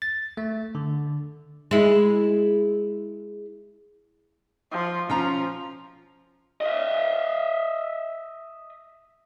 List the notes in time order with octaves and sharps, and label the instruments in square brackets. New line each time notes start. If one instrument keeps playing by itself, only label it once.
[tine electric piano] A6
A3
D3
[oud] G#3 E4
[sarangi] F3
[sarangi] F3 [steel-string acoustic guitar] C#4 F4 A#5
[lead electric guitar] D#5 E5